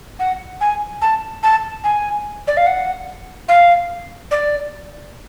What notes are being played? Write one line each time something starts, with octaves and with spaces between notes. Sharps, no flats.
F#5
G#5
A5
A5
G#5
D5
F5
F#5
F5
D5